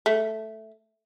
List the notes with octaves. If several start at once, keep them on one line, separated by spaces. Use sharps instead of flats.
A3